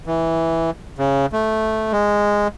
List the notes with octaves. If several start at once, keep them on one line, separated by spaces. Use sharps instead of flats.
E3
C#3
A3
G#3